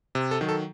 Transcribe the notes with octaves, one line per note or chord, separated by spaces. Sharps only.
C3
A4
D#3 F#3
A4